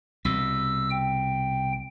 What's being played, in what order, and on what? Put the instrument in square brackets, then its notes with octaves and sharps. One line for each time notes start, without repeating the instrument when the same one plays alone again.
[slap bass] C2 B2 [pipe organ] E6
[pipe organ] G5